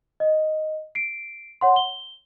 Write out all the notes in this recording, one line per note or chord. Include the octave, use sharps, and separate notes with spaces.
D#5
C7 D7
C#5 F#5 C6
G7